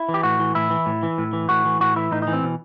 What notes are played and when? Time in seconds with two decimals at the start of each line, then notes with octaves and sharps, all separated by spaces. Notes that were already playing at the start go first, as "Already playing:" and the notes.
Already playing: E4
0.09 E3
0.14 G4
0.23 A2 F#4
0.40 E3
0.55 A2 E4
0.70 E3
0.86 A2
1.03 E3
1.18 A2
1.33 E3
1.49 A2 F#4
1.65 E3
1.81 A2 F#4
1.96 E3 E4
2.12 A2 D#4
2.22 D#4
2.27 E3
2.33 C4
2.44 B2